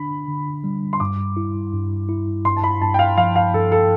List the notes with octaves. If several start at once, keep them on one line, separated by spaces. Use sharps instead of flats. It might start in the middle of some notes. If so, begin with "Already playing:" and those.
Already playing: D3 D4 B5
D3
G3
C6
G2 D6
E4
G2
E4
G2 C6
A5
B5
G2 A5
G5
F5
F3 F5
F5
G2 A4
A4